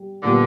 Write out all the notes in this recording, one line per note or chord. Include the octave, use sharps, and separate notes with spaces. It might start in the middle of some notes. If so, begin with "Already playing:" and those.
Already playing: G3
A#2 D3 G3 B3